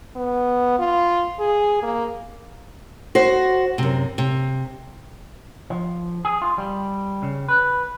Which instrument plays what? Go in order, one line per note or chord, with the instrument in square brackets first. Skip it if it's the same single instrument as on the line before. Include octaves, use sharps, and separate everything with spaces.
[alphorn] B3
F4
G#4
A#3
[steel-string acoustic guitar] F#4 C5
F#2 C3
C3
[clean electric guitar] F3
G#4
F4
G3
C#3
B4